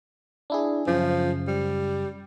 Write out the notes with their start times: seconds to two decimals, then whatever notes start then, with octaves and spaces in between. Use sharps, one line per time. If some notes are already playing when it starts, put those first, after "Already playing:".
0.50 D4 E4 G#4
0.87 F#2 C#3 F3
1.48 G3